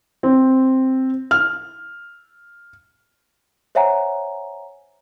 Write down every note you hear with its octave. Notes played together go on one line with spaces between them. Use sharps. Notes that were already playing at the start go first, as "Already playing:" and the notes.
C4
F6
C5 C#5 E5 F#5 G#5 A#5